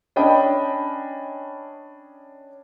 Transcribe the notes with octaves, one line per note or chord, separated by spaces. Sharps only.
C#4 D4 D#5 G5 B5